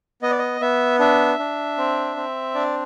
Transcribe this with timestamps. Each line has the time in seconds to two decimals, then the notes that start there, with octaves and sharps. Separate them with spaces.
0.22 B3 D#5
0.31 D5
0.38 D#5
0.61 B3 E5
0.99 D4 E5
1.39 D4
1.77 C4
2.16 C4
2.55 D4 D5